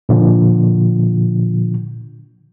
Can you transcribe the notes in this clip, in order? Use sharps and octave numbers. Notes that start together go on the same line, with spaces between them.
A#2 D3 F3